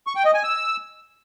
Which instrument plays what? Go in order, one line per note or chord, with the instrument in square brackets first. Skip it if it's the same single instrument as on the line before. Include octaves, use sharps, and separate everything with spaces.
[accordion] C#6
G5
D#5
G#5
E6